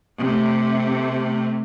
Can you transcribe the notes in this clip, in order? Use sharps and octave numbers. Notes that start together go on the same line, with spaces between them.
C3 A3